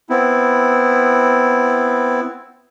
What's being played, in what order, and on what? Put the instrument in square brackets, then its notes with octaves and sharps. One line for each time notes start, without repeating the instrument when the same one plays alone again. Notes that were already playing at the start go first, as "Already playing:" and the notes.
[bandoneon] B3 C4 E4